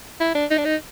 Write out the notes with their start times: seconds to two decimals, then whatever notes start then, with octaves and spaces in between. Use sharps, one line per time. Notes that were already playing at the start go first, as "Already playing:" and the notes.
0.20 E4
0.35 D4
0.51 D#4
0.57 D4
0.65 D#4